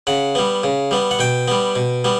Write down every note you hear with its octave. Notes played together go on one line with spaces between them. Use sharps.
C#3 F#5
G3 B3
C#3
G3 B3
F#5
B2 G5
G3 B3
B2
G3 B3